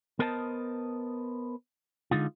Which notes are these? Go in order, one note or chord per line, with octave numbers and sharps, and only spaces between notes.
B3 A#4 C5 D#5 A5
D3 G#3 D#4 F4